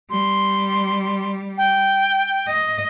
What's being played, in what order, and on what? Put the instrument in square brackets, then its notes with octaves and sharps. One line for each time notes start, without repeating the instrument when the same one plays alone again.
[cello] G3 [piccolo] C6
[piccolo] G5
[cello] D#5